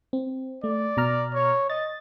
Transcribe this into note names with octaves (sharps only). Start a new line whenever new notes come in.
C4
A3 D5
B2 A#5 F6
C#5
D#5 A6